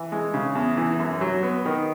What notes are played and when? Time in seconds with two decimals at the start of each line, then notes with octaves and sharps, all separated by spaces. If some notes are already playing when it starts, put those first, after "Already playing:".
Already playing: E3
0.12 G#3
0.34 C#3
0.55 E2
0.77 E3
1.00 F#2
1.21 F#3
1.43 B3
1.65 D#3